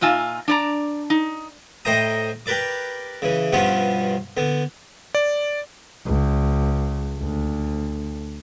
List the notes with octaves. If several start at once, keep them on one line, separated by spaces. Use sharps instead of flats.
A#2 D#4 F4 E5 G#5
D4 D5 A#5
D#4
A2 C5 D#5 G5 A#5 D#6
G4 A#4 B4 D5 D6
C#3 E3
G2 B2 F3 B3 C#4 F4
D3 B3
D5
C#2
D2